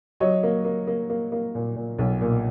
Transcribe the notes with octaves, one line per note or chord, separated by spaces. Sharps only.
F#3 C#5 D#5
A#3
A#3
A#3
A#3
A#3
A#2
A#2
B1
A#2